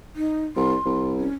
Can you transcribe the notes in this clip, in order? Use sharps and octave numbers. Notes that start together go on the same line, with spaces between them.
D#4
C2 C6
C2
C#4